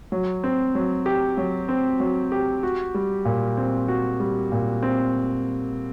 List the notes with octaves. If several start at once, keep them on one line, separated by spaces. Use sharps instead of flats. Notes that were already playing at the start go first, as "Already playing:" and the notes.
F#3
C4
F#3
G4
F#3
C4
F#3
G4
F#4
G3
A#2
C4
F#4
G3
A#2
C4